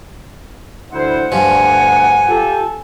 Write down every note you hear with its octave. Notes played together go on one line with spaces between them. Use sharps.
D2 E4 C5 F#5
D2 G2 F3 G#5
F4 G4 A4